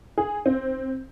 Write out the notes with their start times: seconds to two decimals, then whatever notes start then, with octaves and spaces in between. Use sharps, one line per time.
0.18 G#4
0.46 C4